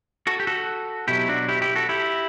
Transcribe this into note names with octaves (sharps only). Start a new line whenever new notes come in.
F#4 A4
G4
F#4 A4
B2 F#3 E4 G4
D4 F#4
E4 G4
E4 G4
F#4 A4
E4 G4